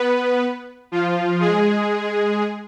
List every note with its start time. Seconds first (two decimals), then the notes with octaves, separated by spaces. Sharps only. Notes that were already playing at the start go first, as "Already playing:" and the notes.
Already playing: B3 B4
0.92 F3 F4
1.40 G#3 G#4